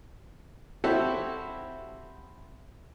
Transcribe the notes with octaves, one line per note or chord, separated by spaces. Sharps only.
C4 E4 F#4 G4 A4 C5